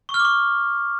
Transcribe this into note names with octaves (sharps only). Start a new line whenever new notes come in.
C#6
F6
D6
C#6